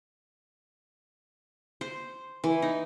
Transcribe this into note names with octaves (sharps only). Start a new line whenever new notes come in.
C5
E3
D#4